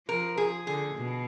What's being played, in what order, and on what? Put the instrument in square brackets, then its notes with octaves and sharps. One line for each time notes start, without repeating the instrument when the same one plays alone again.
[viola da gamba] F3 [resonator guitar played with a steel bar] A#4
[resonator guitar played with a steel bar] G#4
[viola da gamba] D3 [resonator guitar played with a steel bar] G#4
[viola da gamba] B2